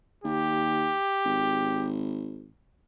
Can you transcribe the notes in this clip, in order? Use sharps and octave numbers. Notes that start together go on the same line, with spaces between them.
D#2 G4
G#1